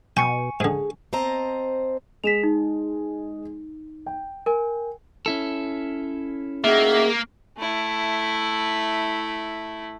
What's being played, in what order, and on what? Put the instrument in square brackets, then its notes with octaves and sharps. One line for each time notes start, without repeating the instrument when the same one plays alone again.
[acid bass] B2 [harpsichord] G5 [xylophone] G#5 C#6 C#7
[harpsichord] G#2 D3 [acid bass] G#4
[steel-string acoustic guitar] C4 C5 D#5 A5 A#5
[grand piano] G#3 G#4 [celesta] B6 E7 F7
[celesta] D#4
[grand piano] G5
[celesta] A#4 G#5
[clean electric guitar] C#4 E4 A4
[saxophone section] D#3 F#4 E5 [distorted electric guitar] A#3 [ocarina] G#4
[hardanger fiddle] A3 E4